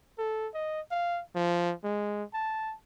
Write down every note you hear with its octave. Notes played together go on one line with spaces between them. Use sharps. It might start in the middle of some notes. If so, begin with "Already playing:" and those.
A4
D#5
F5
F3
G#3
A5